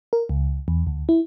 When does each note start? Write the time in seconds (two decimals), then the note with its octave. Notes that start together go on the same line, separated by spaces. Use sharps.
0.13 A#4
0.29 C#2
0.68 E2
0.87 D2
1.09 E4